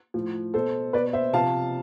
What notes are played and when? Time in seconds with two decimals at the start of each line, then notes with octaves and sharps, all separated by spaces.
0.14 A2 F3
0.54 B2 A4 C5
0.93 B2 B4 D5
1.13 C5 E5
1.33 C3 F3 F5 A5